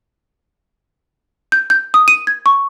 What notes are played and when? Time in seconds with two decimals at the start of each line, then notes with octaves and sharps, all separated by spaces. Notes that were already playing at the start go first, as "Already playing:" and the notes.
1.52 G6
1.70 G6
1.94 D#6
2.08 D#7
2.27 G#6
2.46 C#6